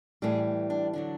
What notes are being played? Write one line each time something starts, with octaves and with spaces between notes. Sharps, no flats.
A2 E3 G3 G#4
D4
D3 F#3 D4